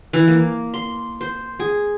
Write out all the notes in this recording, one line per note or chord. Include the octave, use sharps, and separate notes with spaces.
E3
A#3
C6
C5
G#4